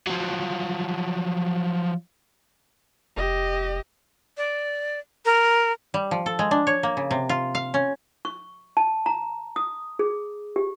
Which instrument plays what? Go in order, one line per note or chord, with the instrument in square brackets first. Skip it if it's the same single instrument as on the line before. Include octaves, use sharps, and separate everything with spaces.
[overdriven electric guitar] F3 F#3
[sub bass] F1 [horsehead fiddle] G4 D#5
[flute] D5
A#4
[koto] G3
F3
A4
G#3
D4
C#5
A#3
C#3
C3
F4
F5
C#4
[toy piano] C#6
A5
A#5
D#6
G#4
G4